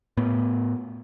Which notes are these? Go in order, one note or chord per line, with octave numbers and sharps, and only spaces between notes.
A2 B3